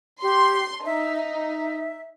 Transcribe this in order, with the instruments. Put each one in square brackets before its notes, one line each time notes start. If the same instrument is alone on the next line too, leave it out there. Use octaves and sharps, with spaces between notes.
[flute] G4 [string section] C6
[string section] D#4 [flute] E5
[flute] E5